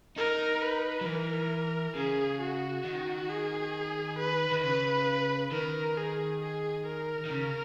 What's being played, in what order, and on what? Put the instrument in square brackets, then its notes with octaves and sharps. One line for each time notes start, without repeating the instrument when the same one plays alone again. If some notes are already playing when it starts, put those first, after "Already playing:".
[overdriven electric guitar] D#4 [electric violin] A#4
[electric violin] B4
[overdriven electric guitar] F#3
[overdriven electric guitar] E3 [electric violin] A#4
[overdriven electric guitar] C#3 [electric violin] G#4
[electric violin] F#4
[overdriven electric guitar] D#3
[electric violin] G#4
B4
[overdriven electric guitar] D#3
[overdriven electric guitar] C#3 [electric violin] B4
[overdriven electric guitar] D#3 [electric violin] A#4
[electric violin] G#4
G#4
A#4
[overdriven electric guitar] D#3
C#3